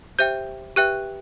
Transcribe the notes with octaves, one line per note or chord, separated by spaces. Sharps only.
G4 C5 E5 G5 G6
G4 B4 E5 G5 F#6